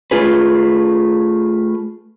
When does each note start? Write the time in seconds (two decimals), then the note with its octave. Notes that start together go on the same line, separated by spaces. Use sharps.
0.11 A3 F4 G#4 B4